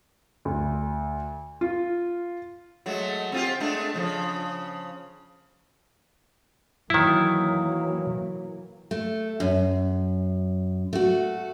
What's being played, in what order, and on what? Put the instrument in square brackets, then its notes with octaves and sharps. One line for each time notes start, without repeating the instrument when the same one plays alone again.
[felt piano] D2
F4
[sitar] F#3 G#3 A3
C4 F4 G4
G#3 A3 D4
C#3 F3
[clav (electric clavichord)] D#3 E4 [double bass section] E3 F#3 A#3
[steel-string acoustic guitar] A3
F#2
A3 F#4